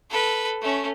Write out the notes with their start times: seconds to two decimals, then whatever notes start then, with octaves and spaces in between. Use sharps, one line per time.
0.10 A4 B4
0.62 A3 C#4